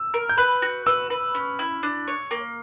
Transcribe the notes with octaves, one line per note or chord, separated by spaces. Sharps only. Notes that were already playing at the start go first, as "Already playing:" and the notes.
Already playing: E6
A#4
G6
B4 F#6
F#4
B4 E6
B4
C#4
E4
D4
C#5
A#3